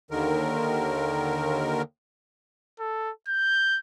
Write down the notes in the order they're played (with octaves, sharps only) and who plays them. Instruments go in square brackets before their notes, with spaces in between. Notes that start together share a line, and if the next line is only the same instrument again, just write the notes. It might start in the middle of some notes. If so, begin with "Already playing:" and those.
[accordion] D#2 D3 D#3 A#4
[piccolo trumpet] A4
G6